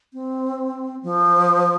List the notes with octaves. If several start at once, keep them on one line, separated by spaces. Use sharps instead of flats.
C4
F3